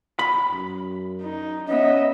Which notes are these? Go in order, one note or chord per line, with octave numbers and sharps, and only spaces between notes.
B5
F#2
D#4
B3 C#4 D#5 E5